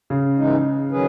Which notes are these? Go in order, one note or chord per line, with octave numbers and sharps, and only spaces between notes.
C#3
G#2 E3 G#3 D#4
D#3 F#3 C#4 G#4 B4